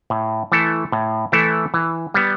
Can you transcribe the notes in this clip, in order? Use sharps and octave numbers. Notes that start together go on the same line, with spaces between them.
A2
E3 A3 E4 A4
A2
E3 A3 E4 A4
E3
G3 B3